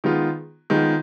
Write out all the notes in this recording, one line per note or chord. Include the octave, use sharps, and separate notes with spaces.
D#3 G#3 B3 F4
D#3 G#3 B3 F4